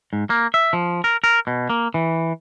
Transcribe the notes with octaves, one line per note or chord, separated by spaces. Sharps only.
G#2
A#3
E5
F3
A#4
A#4
B2
A#3
E3